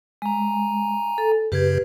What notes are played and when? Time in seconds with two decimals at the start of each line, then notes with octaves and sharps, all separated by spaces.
0.22 G#3 G#5 A#5
1.18 A4
1.52 F#2 C#3 G4 B4 G#6